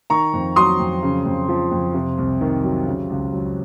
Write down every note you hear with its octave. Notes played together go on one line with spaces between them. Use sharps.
D#3 A#5 C#6
F2
F#3 C6 D#6
F2
C#3
F2
F3
F2
C3
C2
D#3
F#3
C#3
C#2
F#3